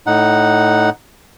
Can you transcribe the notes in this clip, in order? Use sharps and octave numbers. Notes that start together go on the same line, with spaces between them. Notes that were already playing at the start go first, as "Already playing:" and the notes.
A2 D#4 F#5